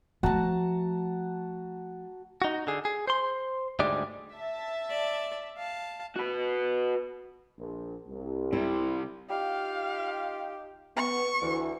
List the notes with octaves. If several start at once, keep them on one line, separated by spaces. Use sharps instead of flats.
F3 A3 F#4 A5 A#5
D#4 F#4
D3 G#4
G#4
C5 C6
D2 G#2 G3 G#3 D5
E5 A5
D5
F5 A5
F#4 B4
A#1
C2
C3 G3 E4
D#4 F4 G4 F5
B3 C#6
D2 E3